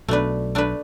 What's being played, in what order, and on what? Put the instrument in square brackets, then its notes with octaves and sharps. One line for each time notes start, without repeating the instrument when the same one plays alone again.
[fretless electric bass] B1 B2 [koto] A3 D4 B4
[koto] A3 D4 B4